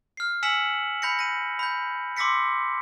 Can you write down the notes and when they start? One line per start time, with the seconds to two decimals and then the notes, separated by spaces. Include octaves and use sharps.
0.17 F6 C7
0.43 G#5 E6 B6 C#7 E7 F#7
1.02 B5 G6 A#6 C#7
1.19 A#6 D#7
1.59 B5 G6
2.17 C6 D6 E6 A#6 B6 C#7